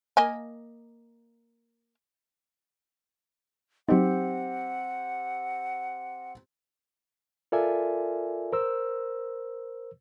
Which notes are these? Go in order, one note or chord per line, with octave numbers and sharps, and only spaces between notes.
A#3 D#5 G#5
F#3 C4 D#4 G4 F#5
F4 A4 A#4 D5 E5 G#5
A#4 C5 E6